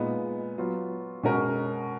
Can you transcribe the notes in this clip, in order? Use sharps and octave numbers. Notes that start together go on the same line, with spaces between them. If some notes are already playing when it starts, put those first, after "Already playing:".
Already playing: A#2 G#3 B3 D#4
F#3 B3 F4
B2 G#3 C#4 F#4 A#4